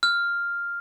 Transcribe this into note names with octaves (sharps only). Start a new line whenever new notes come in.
F6